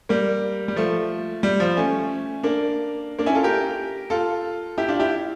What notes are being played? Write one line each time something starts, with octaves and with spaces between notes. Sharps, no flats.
G3 A#3
G3
F3 A3
G3
F3
A3 C#4
A#3 D4
A#3 D4
C#4 E4
F4 A4
G4 A#4
F4 A4
E4 G4
D4 F4
E4 G4